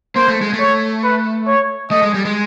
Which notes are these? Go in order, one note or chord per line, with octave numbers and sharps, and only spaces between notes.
A#3 C5
A3
G#3
A3
C#5
B4
C#5
A3 D#5
G#3
G3
G#3